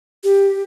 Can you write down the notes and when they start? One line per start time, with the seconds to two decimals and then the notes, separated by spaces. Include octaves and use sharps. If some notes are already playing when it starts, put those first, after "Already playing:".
0.24 G4